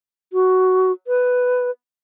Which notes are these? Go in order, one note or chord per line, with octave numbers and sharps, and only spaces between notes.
F#4
B4